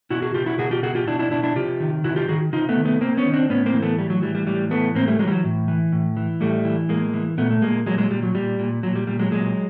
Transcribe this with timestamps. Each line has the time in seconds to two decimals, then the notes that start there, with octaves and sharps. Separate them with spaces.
0.10 B2 E4 F#4
0.22 F#4 G#4
0.34 B2 F4 G4
0.46 E4 F#4
0.58 B2 F#4 G#4
0.71 F4 G4
0.83 B2 F#4 G#4
0.95 F4 G4
1.07 B2 D4 E4
1.19 D4 E4
1.31 B2 D4 E4
1.43 D4 E4
1.56 C3 F4 G4
1.80 D#3
2.04 C3 E4 F#4
2.16 F4 G4
2.28 D#3 F#4 G#4
2.53 C3 D#4 F4
2.69 A3 B3
2.77 D#3
2.85 A3 B3
3.01 C3 A#3 C4
3.17 B3 C#4
3.26 D#3
3.34 C4 D4
3.50 A2 B3 C#4
3.66 A#3 C4
3.74 E3
3.82 A3 B3
3.98 A2 G3
4.10 F#3
4.22 E3 G3
4.35 G3
4.47 A2 G3
4.71 E3 A3 B3
4.95 A2 A#3 C4
5.07 G3 A3
5.19 E3 F#3 G#3
5.27 G3
5.32 F#3
5.44 A2
5.68 E3
5.92 A2
6.17 E3
6.41 A2 G3 A3
6.65 E3
6.89 A2 G#3 A#3
7.14 E3
7.38 A#2 A3 B3
7.50 A3
7.62 A#2 G#3 A#3
7.86 A#2 F#3 G#3
7.98 F#3 G#3
8.10 A#2 G3
8.23 F#3
8.35 A#2 G3
8.59 A#2
8.83 A#2 F#3
8.95 G3
9.07 A#2 G3
9.19 F#3 G#3
9.31 A#2 F#3 G#3